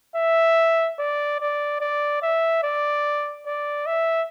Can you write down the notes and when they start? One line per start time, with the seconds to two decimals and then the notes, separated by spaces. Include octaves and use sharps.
0.16 E5
0.99 D5
1.40 D5
1.80 D5
2.22 E5
2.63 D5
3.46 D5
3.86 E5